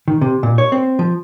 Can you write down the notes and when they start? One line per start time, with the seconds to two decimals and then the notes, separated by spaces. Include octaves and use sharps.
0.08 D#3
0.21 C3
0.43 A#2
0.58 C#5
0.72 C4
0.99 F3